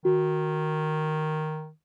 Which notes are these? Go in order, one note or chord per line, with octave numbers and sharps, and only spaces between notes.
D#3 F#4